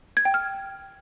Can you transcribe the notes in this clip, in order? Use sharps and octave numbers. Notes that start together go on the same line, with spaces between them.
G#6
G5
F6